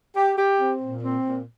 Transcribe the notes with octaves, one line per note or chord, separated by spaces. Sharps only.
G4
G4
C4
A#2
C4
A#2